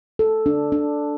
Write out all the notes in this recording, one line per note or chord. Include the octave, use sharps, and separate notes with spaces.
A4
D4
D4